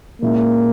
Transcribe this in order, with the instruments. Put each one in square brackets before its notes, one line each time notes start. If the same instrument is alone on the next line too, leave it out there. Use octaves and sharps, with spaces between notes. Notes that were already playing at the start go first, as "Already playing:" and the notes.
[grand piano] A#2 G#3 C#4 E4 [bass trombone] A#3